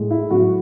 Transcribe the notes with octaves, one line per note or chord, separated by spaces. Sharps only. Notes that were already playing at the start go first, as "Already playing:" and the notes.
Already playing: A2 G#3
E4
A2 F#3 F#4